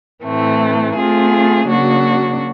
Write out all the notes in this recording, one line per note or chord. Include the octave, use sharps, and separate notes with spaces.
A2 E3 A3 C4
A3 C4 F4 G#4
C#3 F#3 A#3 D4 F#4